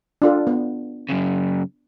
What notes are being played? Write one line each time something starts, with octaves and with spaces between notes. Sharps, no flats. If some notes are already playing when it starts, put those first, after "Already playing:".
D4 F4 A4
B3
F#2 C#3